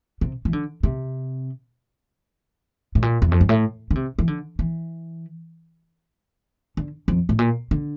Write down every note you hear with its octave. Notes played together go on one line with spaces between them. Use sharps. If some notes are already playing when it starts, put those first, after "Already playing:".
C3
E3
D3
C3
A2
A#2
E2
F2
G2
A2
D3
C3
E3
D3
E3
D3
F2
A2
A#2
D3